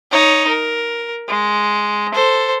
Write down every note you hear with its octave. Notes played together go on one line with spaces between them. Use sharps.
D#4 C#5
A#4
G#3
A4 C5